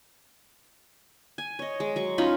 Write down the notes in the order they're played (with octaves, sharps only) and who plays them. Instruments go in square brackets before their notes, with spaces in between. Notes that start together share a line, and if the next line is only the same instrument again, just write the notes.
[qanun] G#5
C#5 D#5
G#3
F#3 C#6
C#4 D#4 F4 B5